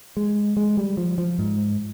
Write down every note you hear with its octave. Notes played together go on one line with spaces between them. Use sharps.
G#3
G#3
G3
F3
F3
G#2